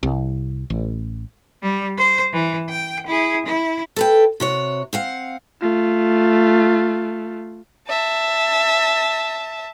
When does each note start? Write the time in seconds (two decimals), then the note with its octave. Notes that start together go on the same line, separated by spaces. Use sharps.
0.03 C2
0.70 A1
1.62 G3
1.98 C5
2.33 E3
2.69 G5
3.06 E4 G#4
3.46 E4
3.96 A4 B4 G5
4.40 C3 F#4 C#5
4.93 C4 F5 F#5
5.61 A3 F4
7.88 E5 A5